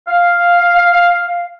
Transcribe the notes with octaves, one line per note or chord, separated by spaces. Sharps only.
F5